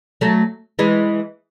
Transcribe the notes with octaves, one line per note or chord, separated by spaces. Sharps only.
F#3 A3
E3 G#3